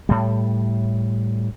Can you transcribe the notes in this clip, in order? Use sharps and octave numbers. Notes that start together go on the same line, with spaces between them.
A2 G3